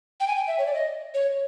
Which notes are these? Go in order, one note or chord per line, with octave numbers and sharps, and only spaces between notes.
G5
G#5
G5
E5
C#5
D5
D#5
C#5